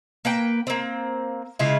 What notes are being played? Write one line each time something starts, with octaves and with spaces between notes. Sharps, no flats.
A#3 B4 G5
A#3 C4
C#3 G#3 E4 F4